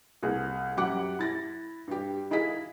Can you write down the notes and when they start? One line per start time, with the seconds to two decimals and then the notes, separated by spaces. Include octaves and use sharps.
0.23 C2 G#4
0.77 F#2 G4 F#5 D6 F#6
1.19 E4 A6 A#6
1.88 G2 G4
2.30 D#4 E4 G#4 F5 B6